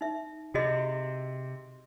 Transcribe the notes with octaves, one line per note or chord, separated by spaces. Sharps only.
D#4 E5
C3 F#4 G#4 D#5